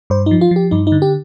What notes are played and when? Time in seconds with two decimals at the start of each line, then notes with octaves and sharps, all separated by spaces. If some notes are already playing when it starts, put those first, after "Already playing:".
0.10 G2 C5
0.26 F3 D#4
0.41 F4
0.51 F3 G4
0.71 G2 D#4
0.87 D#4
0.92 D3
1.02 G4